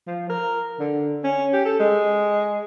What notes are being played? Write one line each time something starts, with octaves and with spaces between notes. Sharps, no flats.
F3
A#4
D3
C#4
G4
A4
G#3